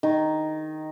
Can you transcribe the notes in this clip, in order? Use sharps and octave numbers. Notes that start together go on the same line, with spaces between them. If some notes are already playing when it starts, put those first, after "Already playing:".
D#3